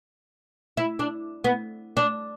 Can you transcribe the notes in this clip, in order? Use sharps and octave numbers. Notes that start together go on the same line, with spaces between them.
E4
D4
B3
D4